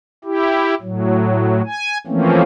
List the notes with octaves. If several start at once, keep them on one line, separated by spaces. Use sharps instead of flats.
E4 G4
A2 F#3
G#5
E3 F3 A3 A#3 C4 C#4